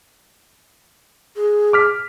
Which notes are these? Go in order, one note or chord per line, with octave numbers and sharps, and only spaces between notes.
G#4
D6 F6 B6